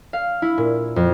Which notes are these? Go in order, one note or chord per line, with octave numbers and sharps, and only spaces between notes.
F5
E4
A#2
F2